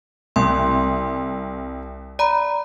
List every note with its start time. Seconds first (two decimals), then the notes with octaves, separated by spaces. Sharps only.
0.36 C2 C6
2.19 D5 A#5 B5